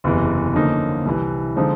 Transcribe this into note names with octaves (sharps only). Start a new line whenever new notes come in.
F#1 E2 C3 E3
F#2 D3 F3 A#3 D#4
C2 C3 E3
D3 F3 G#3 C4 D#4